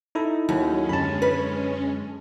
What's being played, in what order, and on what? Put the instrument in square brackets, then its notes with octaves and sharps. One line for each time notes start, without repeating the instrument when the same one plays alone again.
[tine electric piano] D#4 E4 A4
[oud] D#2 [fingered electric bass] F#3 [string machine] G#3 C#4
[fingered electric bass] F#2 D3 [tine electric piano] A5 B5
[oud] B4